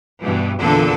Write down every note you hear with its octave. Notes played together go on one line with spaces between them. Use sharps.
G2 B2 E3
E2 A#2 D3 E3 A4